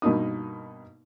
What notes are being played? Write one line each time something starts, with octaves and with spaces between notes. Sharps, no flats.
G2 B2 A#3 D#4 D#6